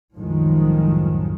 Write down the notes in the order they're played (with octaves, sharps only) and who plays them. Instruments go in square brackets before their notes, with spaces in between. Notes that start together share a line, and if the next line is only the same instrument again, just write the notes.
[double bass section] C2 F#2 A2 D#3 F3 G#3